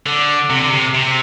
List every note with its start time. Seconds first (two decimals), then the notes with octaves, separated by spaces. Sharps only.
0.06 D3
0.50 C3
0.60 D3
0.70 C3
0.94 C3